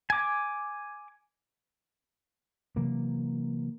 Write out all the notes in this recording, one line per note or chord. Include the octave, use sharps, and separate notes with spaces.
G#5 D6
C3 E3 F#3 A#3